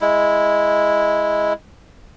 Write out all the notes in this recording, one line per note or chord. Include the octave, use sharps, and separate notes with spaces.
G#3 E4